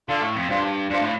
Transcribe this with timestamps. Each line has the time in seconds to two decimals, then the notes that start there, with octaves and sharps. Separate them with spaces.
0.08 D3 F4 A4 D5 F5
0.21 A2
0.36 F2
0.49 G2 D4 F4 C5
0.90 G2 D4 F4 C5
1.01 A2